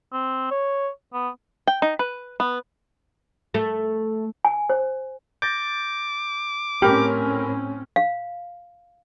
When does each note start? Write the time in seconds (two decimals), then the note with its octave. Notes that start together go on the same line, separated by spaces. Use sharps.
0.12 C4
0.51 C#5
1.13 B3
1.67 G5
1.82 D#4
1.99 B4
2.40 B3
3.54 A3
4.45 G#5
4.70 C5
5.42 D6 G6 A6 A#6
6.82 A2 C4 C#4 G4 A#4 B5 F6
7.96 F5